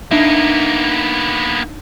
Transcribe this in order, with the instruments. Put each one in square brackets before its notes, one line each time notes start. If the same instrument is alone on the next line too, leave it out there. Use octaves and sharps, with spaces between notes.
[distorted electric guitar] A#3 B3 [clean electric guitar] D4 D#4 E5